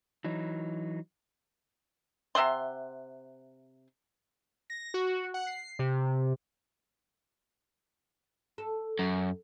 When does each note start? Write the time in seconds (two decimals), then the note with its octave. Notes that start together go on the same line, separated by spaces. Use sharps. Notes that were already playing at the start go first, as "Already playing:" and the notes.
0.24 E3 F#3 D#4
2.35 C3 E5 F#5 C6
4.70 A#6
4.94 F#4
5.34 F#5
5.47 C7
5.79 C3
8.58 A4
8.99 F#2